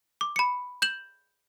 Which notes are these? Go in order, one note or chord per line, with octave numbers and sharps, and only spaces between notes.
D6
B5 C#7
G6 E7 F#7